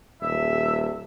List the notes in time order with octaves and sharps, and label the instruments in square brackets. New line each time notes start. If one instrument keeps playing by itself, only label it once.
[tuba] D#1 [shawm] E5